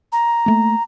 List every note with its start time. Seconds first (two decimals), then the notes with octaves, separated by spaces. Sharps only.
0.12 A#5
0.46 A3 A#3